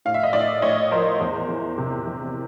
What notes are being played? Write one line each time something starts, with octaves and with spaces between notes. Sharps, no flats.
A2 F5
E5
D#5
A2 D5 E5
A2 C#5 D#5
F3 A#4 C5
E2
E3
C3
E2